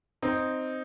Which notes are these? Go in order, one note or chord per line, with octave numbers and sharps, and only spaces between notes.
C4 D#4